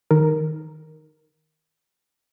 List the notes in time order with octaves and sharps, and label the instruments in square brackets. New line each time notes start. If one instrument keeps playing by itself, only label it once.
[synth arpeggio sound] D#3 A#4